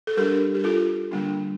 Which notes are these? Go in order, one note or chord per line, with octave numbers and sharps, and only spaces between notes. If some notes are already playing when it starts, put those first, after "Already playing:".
A4
G3 D4 G4 A#4
G4
F4 A4
D3 G3 A#3 D4